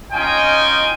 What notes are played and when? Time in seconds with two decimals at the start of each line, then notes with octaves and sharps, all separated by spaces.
0.13 C#4 D#4 F4 D#5 G5 G#5